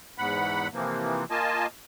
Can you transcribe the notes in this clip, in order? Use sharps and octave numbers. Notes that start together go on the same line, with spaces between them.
E2 G#2 F#5 B5
C3 E3 F3 A#3
A#3 F4 D#5 G#5 A5